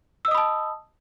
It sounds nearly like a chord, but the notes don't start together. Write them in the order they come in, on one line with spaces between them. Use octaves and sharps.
E6 D#5 D#6 B5 A5